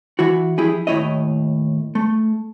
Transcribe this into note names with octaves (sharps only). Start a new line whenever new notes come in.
E3 E4 F#4
F3 E4 G4 G#4
D#2 A2 E4 C#5 D#5
A3